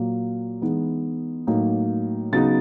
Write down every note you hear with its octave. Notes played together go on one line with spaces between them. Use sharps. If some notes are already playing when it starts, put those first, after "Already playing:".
Already playing: A#2 F#3 A#3
E3 G#3 B3 D#4
A2 F#3 A#3 D#4
C#3 F#3 B3 D#4 A6